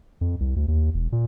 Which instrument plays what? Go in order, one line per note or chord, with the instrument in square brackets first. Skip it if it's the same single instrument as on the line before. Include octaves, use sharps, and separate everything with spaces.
[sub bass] F2
C2
D2
D#2
E1
A#2